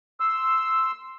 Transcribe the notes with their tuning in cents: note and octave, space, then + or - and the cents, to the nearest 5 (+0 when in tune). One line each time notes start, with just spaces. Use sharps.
C6 +0 E6 +0